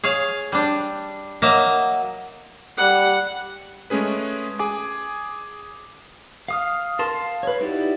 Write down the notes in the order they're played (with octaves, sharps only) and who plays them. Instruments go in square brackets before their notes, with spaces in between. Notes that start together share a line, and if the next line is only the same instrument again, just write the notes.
[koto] G#4 C#5 F5
G3 D4
F#3 A#3 D#5 E5
[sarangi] G3 [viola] F#5
[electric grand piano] G#3 A3 C#4 G#4 B4
G#4 G#5 D6
[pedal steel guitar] F5 D#6 F6
A#4 A5 C6
F5
B4 C#5
D#4 E4 F#4 G4 D5